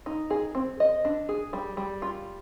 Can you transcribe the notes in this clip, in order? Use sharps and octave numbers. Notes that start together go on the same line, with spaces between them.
D#4
G#4
C4
D#5
D4
G#4
G3
G3
F4